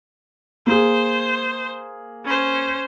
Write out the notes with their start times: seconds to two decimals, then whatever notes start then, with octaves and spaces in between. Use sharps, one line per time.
0.67 A#3 G#4 C5
2.25 C#4 C5